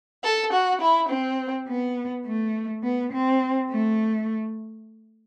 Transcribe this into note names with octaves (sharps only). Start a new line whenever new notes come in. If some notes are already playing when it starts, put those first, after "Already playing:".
A4
F#4
E4
C4
B3
A3
B3
C4
A3